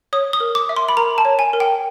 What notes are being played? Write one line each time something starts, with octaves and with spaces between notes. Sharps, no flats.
C#5 D#6
D#6
A#4
D6
E5
C6
B5
A#4 A#5
A5
C#5
G#5
A#4
G5